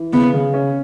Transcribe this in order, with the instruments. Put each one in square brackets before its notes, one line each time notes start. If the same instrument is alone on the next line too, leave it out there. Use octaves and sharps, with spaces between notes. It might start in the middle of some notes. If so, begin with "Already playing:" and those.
Already playing: [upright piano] E3
[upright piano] C#3 [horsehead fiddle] B3
[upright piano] C#3
C#4